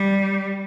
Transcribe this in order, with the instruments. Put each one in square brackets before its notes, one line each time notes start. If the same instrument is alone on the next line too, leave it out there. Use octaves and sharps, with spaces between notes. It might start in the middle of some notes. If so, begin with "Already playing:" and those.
Already playing: [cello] G3